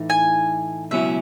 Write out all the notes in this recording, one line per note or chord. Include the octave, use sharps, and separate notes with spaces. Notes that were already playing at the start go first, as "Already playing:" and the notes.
Already playing: A2 E3 A3 D#4
G#5
C#2 B2 F#3 C#4 E4 E5